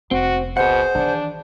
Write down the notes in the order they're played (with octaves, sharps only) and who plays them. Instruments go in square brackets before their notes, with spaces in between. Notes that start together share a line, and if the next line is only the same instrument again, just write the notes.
[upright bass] F1 [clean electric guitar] C4 [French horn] F#4
[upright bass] C#2 [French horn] B2 [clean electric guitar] G#4 F#5 [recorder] C5
[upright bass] D#3 E3 [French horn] D4